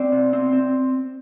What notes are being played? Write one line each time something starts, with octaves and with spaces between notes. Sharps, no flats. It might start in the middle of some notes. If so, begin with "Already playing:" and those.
Already playing: C4 D5
C3
C4
C4